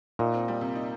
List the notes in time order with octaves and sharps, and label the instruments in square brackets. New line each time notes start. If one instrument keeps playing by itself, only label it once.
[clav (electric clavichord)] A#2 [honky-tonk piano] D#4
[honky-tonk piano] C4
G3
C3
D#4